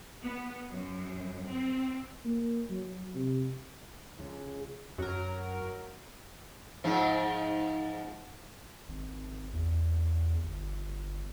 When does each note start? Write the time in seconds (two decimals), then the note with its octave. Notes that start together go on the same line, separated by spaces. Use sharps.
0.23 B3
0.70 F#2
1.49 C4
2.25 A#3
2.70 F#3
3.14 C3
4.19 C#2
4.98 F#2 F#3 A#4
6.84 G#2 F3
8.89 G#1
9.53 E2
10.44 G1